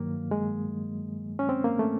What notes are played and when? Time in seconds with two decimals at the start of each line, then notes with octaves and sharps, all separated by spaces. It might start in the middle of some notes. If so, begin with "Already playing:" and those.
Already playing: G2 D#3 F#3 A#3
0.31 G#3
1.39 C#4
1.49 C4
1.64 A#3
1.79 A3